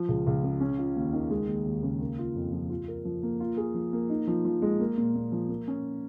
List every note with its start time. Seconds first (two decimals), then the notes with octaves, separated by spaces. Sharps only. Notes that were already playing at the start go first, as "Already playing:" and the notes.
Already playing: F3
0.08 C#2
0.27 C#2
0.43 C#3
0.60 C#4
0.78 F4
0.96 D#2
1.13 D#3
1.31 G#3
1.48 D#2
1.66 D#2
1.83 C#3
2.01 A#3
2.19 F4
2.35 F2
2.53 F3
2.70 F4
2.88 A#4
3.05 F3
3.23 A#3
3.40 F4
3.57 G#4
3.75 F3
3.93 A#3
4.10 D#4
4.27 F3
4.45 F3
4.62 G#3
4.80 A#3
4.97 A#2
5.15 A#2
5.32 F3
5.49 A#3
5.68 C#4